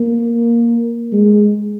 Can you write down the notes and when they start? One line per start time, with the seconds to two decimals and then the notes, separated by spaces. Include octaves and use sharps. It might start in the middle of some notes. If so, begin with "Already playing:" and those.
Already playing: A#3
1.12 G#3